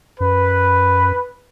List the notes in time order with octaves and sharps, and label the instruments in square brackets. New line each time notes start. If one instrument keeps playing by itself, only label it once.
[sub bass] F#2 [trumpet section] B4